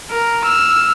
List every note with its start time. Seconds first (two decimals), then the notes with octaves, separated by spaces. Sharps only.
0.11 A#4
0.44 E6 F6